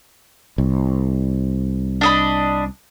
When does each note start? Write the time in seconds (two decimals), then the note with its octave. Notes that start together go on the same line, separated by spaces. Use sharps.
0.58 C2
2.01 D4 D#5 B5